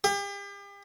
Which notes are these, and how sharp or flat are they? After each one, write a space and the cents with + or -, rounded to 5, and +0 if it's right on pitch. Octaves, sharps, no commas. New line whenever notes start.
G4 +40